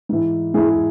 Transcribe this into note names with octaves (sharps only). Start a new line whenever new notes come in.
G#2 E3
G#2 E3 E4 G#4
G#4